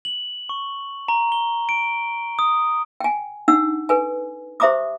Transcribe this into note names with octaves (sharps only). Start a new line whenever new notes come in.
F#7
C#6
A#5
G7
D7
D#6
G5 G#5
D4 D#4 F#5 E6
A4 B4 G#5
G4 C5 E5 A#5 D6 D#6